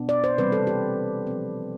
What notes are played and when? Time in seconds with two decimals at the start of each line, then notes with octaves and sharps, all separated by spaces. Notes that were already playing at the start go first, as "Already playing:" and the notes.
Already playing: B2 B3 D4
0.09 D5
0.24 C5
0.38 C3 E3 G3 C4 B4
0.52 A4
0.67 G4
1.27 F3 C4